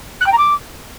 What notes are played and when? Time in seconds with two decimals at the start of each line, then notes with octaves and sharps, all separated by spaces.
0.21 F#6
0.26 G5
0.32 A#5
0.38 D6